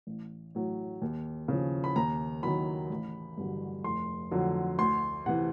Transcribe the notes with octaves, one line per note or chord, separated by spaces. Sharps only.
A1
A2 F#3
D#2
C#3 F3
B5
D#2 A#5
D#3 F#3 B5
A1
G2 D3 F#3
F1 C6
F2 D3 F#3
D2 C6
C3 E3 F#5